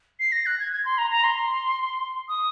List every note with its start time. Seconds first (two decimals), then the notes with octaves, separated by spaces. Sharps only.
0.19 C7
0.32 A#6
0.46 F#6
0.59 G#6
0.72 G#6
0.85 C6
0.98 A#5
1.11 A#5
1.24 C6
2.29 D#6